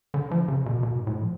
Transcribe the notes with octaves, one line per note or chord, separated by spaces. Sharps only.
D3
F3
C#3
B2
B2
G#2
A2
F3